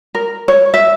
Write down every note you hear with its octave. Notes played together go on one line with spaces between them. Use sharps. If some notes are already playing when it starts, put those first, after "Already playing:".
A#4
C#5
E5